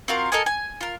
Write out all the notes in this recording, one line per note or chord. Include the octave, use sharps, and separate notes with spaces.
C4 F4 F#4 A#4
A4 A#4 D#5 G#5
G#5
F4 A#4